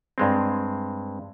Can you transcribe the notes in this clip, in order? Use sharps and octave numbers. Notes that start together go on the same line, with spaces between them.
G2 G#3 C4